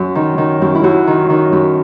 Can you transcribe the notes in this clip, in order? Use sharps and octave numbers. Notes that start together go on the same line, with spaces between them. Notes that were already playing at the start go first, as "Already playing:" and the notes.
Already playing: F#2
D#3
D#3
F#2
E4
F#2 F#4
D#3
D#3
F#2